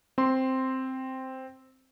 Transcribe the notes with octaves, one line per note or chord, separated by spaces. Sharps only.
C4 C6